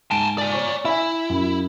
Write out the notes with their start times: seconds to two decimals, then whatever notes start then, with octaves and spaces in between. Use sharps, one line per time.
0.11 G#2 G#5 A5 D7 G7
0.38 D5 G#5
0.52 C#5 C#6
0.85 E4 E5 G#5
1.29 F#2